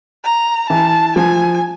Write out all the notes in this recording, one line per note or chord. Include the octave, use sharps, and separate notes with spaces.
A#5
E3 A5
F3 G#5